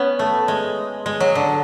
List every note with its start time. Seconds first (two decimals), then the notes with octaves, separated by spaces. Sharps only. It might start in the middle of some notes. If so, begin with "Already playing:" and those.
Already playing: B3 C#4
0.19 A3
0.48 G#3
1.06 G#3
1.20 F#3
1.35 D3